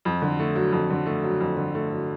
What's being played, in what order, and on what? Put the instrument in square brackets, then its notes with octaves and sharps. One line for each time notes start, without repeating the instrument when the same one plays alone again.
[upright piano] F2
D3
A3
F#3
F2
D3
A3
F#3
F2
D3
A3
F#3